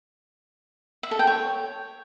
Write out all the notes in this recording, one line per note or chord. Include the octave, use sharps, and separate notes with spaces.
E5
A4
G5
C#5